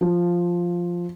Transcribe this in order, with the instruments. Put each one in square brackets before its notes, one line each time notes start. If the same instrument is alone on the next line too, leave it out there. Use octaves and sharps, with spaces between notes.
[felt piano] F3